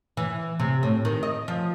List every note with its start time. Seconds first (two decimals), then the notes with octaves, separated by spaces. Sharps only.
0.17 E3
0.60 C3
0.83 A2
1.05 D#3
1.23 D#5
1.48 F3